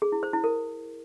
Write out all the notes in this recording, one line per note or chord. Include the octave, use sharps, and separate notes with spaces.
G#4
E4
C5
E4
A#4